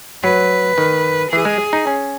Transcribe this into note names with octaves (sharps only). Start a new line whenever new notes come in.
F#3 B4
D#3
E3 G#4
G#3
D#4
C#4